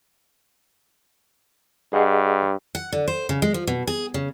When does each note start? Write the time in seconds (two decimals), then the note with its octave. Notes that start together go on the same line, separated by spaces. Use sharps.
1.93 G2 G#4 D#5 F#5
2.75 F#5
2.93 D3
3.08 C5
3.29 C#3
3.42 G#3
3.54 F3
3.67 B2
3.87 G#4
4.14 C#3